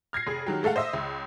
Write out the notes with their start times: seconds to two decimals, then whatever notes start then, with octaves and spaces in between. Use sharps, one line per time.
0.13 F6 G#6 A#6 C7
0.27 F1 G#4
0.46 D#3 F#3 G4
0.63 G#3 A3 A4 F5 F#5
0.76 C5 D#5 E5 E6
0.94 C#2